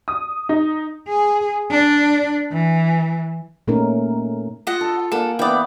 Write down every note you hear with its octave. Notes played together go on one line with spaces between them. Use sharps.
D#6
D#4
G#4
D4
E3
A#2 A3 C#4 D#4 A#4
F4 D#5 F#5
A4
A#3 A4 F#5 G#5
E3 B3 D5 G5